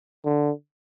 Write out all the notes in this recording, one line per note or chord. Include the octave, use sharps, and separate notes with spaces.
D3